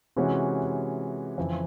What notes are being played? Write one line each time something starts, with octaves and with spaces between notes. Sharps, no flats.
C3 E3 G#3 C#4 F#4
F2 C#3 E3